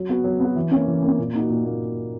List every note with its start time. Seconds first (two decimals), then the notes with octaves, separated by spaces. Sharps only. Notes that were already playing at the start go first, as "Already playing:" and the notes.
Already playing: F#3
0.09 B3 F#4
0.24 F#3
0.40 B3 F#4
0.56 E3
0.71 A#3 C#4
0.88 E3
1.03 A#3 C#4
1.18 A#2
1.34 A#3 D#4 F#4
1.50 A#2
1.65 A#3